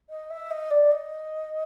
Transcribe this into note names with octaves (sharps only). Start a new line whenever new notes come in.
D#5
E5
D#5
D5
D#5